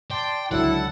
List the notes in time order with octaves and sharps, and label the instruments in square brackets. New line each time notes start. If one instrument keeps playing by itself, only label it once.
[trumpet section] D5 A5 C6 [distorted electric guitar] G5
[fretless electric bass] C#2 D3 F#3 [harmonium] E4 [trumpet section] A4 [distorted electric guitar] F#5